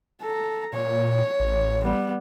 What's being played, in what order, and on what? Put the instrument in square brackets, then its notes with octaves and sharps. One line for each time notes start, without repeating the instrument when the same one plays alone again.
[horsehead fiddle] A4 A#5
[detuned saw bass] A#2 [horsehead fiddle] C#5
[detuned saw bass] A1
[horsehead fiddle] G3 B3